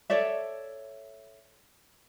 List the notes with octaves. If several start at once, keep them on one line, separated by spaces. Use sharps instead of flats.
A4 C#5 D5 E5